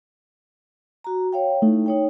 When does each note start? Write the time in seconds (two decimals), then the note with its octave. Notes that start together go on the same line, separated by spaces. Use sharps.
1.04 F#4 A#5
1.33 C#5 F5 G5
1.62 A3 D#4 E4
1.86 D#4 C#5 G5